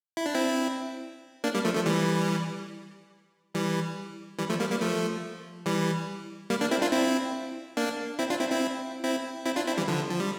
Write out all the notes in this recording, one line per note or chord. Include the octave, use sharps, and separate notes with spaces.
E4
D4
C4 E4
A#3 D4
G3 A#3
F3 A3
F3 A3
E3 G3
E3 G3
E3 G3
F3 A3
G3 A#3
G3 A#3
F3 A3
E3 G3
G3 A#3
A#3 D4
C4 E4
D4 F4
C4 E4
A#3 D4
C4 E4
D4 F4
C4 E4
C4 E4
C4 E4
C4 E4
D4 F4
C4 E4
E3 G3
D3 F3
F3
G3